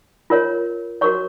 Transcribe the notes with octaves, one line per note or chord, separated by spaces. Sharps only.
F4 A#4 C#5
F#4 A#4 C#5 C#6